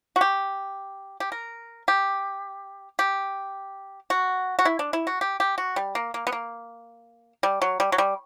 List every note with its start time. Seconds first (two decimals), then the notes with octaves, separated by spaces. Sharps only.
0.16 F#4
0.21 G4
1.20 G4
1.32 A#4
1.88 G4
2.99 G4
4.10 F#4
4.59 F#4
4.65 E4
4.79 D4
4.93 E4
5.07 F#4
5.21 G4
5.40 G4
5.58 F#4
5.76 G3
5.95 A#3
6.14 A#3
6.27 B3
6.32 A#3
7.43 G3
7.62 F#3
7.80 G3
7.92 F#3
7.98 G3